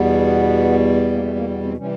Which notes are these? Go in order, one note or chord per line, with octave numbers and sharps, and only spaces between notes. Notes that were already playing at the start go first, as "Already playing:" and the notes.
Already playing: E2 B2 G3 B3
A#3
A3
A#3
B3
C4
C3 E3 G3 C#4